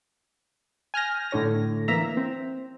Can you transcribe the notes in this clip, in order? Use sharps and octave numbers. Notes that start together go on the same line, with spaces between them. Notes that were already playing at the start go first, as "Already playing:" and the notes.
G#5 F6 G6 A#6
A2 D3 C#5 A#6
E3 A#3 E5 A#5
C4